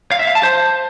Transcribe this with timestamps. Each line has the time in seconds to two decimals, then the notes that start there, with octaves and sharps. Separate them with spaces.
0.11 F5
0.19 E5
0.27 F5
0.35 A5
0.43 C5